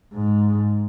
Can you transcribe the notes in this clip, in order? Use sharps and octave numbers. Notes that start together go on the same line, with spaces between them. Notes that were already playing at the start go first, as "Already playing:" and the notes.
G#2